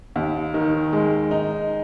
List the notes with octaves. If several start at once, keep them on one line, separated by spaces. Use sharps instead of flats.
D#2
D#3
G#3
D#4